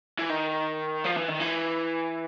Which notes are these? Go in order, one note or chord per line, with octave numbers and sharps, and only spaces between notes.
E3
D#3
F3
E3
D#3
E3